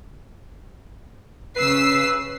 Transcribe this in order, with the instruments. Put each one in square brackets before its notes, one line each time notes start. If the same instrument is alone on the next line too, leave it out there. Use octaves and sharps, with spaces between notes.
[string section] C#3 E6 C7 [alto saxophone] B4